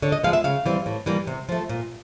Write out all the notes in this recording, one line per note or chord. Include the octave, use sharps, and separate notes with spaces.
D3 C#5
D#5
F3 G#3 B3 F5
E5
C#3 F5
E3 G3 C4
A2
E3 G3 A#3
C3
F3 A3
A#2